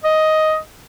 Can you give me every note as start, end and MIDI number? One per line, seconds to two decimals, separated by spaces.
0.04 0.58 75